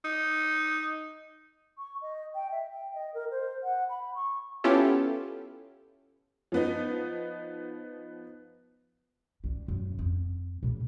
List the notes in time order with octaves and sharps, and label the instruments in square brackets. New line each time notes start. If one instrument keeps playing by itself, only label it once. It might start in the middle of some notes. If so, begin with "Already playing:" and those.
[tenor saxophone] D#4
[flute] C#6
D#5
G5
E5
G5
D#5
A#4
C5
F#5
B5
C#6
[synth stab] B3 C#4 E4 F4 G4 A4
[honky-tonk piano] F3 B3 D#4
[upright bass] D2 G3
F#2
F2 C4
A#2 C#3